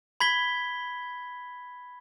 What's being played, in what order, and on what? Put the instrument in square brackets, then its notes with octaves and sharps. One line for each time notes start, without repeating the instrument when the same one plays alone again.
[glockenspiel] B5 G#6 B6 G7